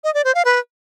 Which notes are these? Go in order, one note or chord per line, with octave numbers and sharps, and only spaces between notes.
D#5
D5
C5
F5
B4